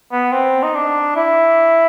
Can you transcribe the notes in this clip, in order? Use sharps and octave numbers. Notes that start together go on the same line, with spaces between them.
B3
C4
D#4
D4
E4